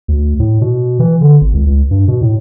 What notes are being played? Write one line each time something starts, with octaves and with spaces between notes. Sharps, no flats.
D2
A2
B2
E3
D3
G#1
C#2
C#2
G2
B2
A2